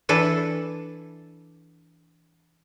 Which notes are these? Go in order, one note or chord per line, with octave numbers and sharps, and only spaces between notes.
E3 D4 A4 B4